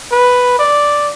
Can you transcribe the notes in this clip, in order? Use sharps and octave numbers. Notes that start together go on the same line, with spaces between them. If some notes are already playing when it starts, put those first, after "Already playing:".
B4
D5